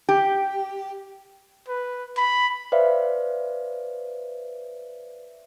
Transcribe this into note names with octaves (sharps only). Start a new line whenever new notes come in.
G4
B4
B5
B4 C5 D5 E5 F5